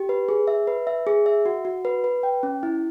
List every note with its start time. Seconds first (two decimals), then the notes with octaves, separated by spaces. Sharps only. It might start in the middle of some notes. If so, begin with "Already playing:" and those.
Already playing: G4
0.09 B4
0.29 G#4
0.47 E5
0.67 B4
0.87 E5
1.07 G#4
1.26 E5
1.46 F#4
1.65 F#4
1.85 B4
2.04 B4
2.23 G5
2.43 C#4
2.63 E4